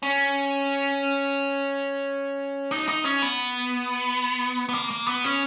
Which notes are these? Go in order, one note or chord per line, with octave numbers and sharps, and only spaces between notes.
C#4
D#4
D#4
C#4
B3
B3
A#3
A#3
B3
C#4